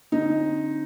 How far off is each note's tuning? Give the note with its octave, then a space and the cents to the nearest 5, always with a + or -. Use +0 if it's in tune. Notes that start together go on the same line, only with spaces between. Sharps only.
D3 +0 C4 +35 D#4 +0